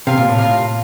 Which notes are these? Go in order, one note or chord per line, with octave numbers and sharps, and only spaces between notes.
C3 F4 A#4 F5
A#2
A2
F4 A#4 F5